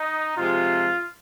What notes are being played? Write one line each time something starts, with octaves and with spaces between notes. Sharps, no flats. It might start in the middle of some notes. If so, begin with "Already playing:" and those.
Already playing: D#4
C3 F3 G#3 F4